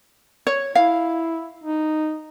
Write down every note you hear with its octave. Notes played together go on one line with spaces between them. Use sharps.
C#5
E4 F5
D#4